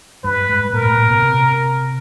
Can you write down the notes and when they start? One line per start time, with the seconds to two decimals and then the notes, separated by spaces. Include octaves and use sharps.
0.24 G2 B4
0.49 G#2
0.73 A#2 A#4
0.85 A2
0.98 A#2
1.11 B2
1.22 C3